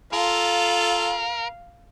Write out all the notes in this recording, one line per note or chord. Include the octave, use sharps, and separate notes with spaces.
F4 A4 A#4 F5